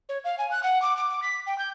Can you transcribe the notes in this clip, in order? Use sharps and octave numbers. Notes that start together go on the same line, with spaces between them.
C#5
F5
G#5
F#6
F#5
D6
D6
D6
B6
G5
G6